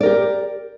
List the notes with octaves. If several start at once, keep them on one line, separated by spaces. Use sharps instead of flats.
G4 A#4 D5